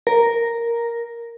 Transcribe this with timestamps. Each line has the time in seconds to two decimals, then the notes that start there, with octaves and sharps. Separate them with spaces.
0.07 A#4